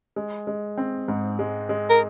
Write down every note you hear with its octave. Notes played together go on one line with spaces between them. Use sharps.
G#3
G#3
C4
G#2
G#3
G#3
A#4